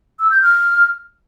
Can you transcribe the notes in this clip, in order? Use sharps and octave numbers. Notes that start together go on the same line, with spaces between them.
E6
G6
F6